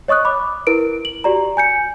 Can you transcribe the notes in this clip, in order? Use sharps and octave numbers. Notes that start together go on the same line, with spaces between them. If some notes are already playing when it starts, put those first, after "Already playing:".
C#5 D#5 C#6 D#6 F#6
B5 D6
E4 A#4 B4 D7
F#7
F#4 G4 D5 A#5
G#5 G6 C#7